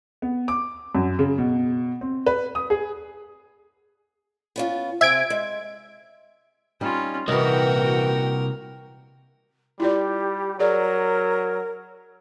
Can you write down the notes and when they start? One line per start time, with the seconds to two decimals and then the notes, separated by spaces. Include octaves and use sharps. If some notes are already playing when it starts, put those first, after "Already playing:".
0.22 B3
0.48 D6
0.95 F#2
1.19 C#3
1.38 B2
2.01 C4
2.26 B4
2.55 D#6
2.70 G#4
4.56 B3 C#4 F4
5.01 C3 C4 E5 G#5 G#6 D7
5.30 G#3
6.81 G3 C#4 D#4 F4
7.28 C2 A#2 E3 F#4 A#4 D#5 G5
9.80 G3 E4 F4 G4 D5
10.60 F#3 G#4 A#4 D5